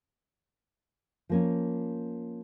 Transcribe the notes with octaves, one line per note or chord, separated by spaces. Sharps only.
F3 A#3 C#4